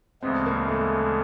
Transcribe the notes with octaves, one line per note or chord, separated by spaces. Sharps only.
D2 C#3 E3 G#3 B3 C4
A#3
A3